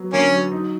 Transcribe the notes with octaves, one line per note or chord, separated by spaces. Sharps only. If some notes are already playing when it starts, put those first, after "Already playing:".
Already playing: F#3 B3
D3 A#3 C#4
F#3
D#4